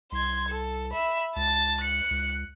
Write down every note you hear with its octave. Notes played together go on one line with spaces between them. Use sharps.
C2 C6 G#6
A4
E5 B5
C#2 A5 A6
F#6 C#7
C#2